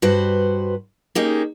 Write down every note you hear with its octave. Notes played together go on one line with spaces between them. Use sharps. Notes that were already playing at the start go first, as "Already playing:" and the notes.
G2 F#4 B4 C5
A#3 C#4 D#4 G4 G#4